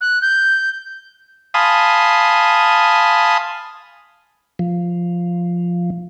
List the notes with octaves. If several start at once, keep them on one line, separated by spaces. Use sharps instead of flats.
F#6
G6
F5 G#5 A5 B5 C6 D#6
F3